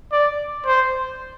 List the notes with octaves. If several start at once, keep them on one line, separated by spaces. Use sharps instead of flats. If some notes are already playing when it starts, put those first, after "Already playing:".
D5
C5